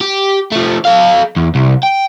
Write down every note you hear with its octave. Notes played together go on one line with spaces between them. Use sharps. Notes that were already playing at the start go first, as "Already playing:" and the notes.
G4
F3 A3
A4 F5
E2
C2
G5